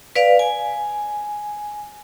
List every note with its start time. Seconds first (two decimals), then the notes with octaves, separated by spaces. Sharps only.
0.15 B4 D5 F5
0.39 G#5